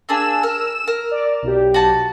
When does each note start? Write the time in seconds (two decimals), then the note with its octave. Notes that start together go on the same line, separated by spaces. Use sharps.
0.09 A#3 D4 G#4 E6 E7
0.43 A#4
0.87 A#4
1.11 D5
1.42 B1 G4
1.74 F#4 A5